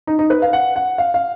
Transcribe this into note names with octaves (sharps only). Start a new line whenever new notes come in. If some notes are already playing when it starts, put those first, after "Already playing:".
D#4
D#4
B4
F5
F#5
F#5
F5
F5